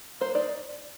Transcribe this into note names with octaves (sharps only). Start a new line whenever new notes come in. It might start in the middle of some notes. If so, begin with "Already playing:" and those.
A#3 C5
D#4 D5